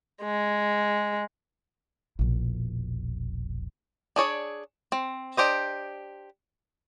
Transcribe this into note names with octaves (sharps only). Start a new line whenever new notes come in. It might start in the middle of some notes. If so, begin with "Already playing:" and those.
G#3
E1 A#1
D4 G#4 C#5 D5
C4
D4 G4 C5 D#5